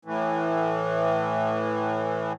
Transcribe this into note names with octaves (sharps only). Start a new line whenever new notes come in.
A2 E3